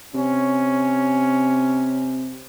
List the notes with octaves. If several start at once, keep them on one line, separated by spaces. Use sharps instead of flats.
C3 C#4